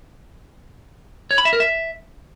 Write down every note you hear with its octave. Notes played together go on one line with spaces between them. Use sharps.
C#5
B5
E5
A#4
E5